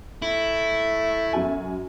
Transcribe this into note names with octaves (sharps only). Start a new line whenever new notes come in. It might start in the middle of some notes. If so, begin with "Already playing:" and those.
A3 E4
F#2 F#4 G#5